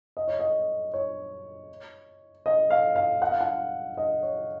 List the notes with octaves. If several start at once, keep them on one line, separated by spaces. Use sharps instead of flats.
D#5
C#5
D#5
C#5
D#5
F5
F5
F#5
F5
F#5
D#5
C#5